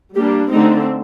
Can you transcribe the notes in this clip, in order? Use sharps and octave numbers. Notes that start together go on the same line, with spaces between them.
G3 A#3 D4 G4
D3 A3 C4 D#4